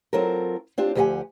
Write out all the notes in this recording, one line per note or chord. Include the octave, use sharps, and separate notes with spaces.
F#3 C4 F4 A4 A#4
C4 D4 F4 G4
D2 F3 G4 D#5 F#5 G#5